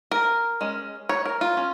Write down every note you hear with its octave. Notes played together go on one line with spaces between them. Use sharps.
A#4
G#3 C#4
C#5
A#4
F4
C#4